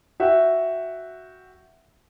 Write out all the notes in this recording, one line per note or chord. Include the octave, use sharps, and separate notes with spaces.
F#4 E5 F#5 G5